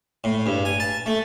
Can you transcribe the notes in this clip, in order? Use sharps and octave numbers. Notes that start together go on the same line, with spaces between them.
A2
G2
G#5
A5
A3